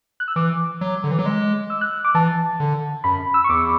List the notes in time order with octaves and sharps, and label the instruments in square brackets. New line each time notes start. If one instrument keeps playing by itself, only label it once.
[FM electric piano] F#6
E6
[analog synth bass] E3 [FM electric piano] D6
[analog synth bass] F#3
D3
E3
F#3
G#3
[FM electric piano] E6
F#6
D6
[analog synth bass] E3 [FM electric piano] A5
[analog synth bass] D3
[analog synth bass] F#2 [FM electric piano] B5
[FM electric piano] E6
C#6
[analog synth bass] E2 [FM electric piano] D6